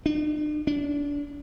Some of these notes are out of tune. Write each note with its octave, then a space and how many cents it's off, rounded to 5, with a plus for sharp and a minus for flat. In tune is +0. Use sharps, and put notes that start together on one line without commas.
D4 +45
D4 -30